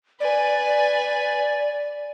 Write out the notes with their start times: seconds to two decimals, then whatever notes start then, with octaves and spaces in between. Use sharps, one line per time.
0.20 B4 D5 G#5